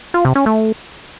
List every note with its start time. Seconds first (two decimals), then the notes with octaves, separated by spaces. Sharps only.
0.14 F4
0.25 C3
0.35 C#4
0.46 A3